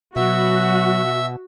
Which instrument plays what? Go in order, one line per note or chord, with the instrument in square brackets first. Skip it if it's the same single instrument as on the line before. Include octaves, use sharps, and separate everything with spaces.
[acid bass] B2 [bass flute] F#3 [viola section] F#4 [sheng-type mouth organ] E5